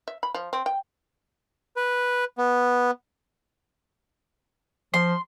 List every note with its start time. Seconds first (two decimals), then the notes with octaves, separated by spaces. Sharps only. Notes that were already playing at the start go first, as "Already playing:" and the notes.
0.08 E5
0.23 B5
0.34 F3
0.53 C4
0.66 G5
1.76 B4
2.38 B3
4.94 F3 C6